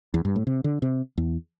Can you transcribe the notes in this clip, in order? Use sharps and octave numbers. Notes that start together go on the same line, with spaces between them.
E2
G2
A2
C3
D3
C3
E2